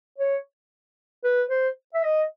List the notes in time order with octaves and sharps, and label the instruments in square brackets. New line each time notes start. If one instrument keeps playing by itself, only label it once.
[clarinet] C#5
B4
C5
E5
D#5